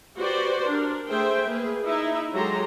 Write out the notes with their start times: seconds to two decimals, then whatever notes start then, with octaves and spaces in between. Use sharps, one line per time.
0.17 F#4 G4 B4 C5 D5
0.68 D4 A#4
1.08 A3 G#4 C5 E5 G5
1.48 A#3 G#4 B4
1.85 D#4 E4 E5
2.32 F#3 G#3 G4 A4 A#5 C6